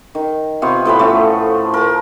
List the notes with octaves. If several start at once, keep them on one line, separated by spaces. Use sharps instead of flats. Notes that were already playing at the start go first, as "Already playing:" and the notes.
D#3
C3 B3 F4 C#6
A2 F3 B4 B5
A3 C#4
A#4 A5